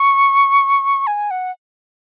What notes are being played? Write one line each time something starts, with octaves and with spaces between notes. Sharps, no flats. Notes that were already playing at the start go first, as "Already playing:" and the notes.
Already playing: C#6
G#5
F#5